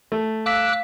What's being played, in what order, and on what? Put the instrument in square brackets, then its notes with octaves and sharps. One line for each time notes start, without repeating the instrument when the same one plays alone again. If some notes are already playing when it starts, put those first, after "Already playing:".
[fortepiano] A3
[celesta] F5 B6 [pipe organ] D6 E6 F#6